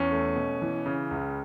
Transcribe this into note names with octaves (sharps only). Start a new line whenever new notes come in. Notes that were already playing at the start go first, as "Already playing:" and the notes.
Already playing: E2 C#4
A3
B2
E3
C#3
C#2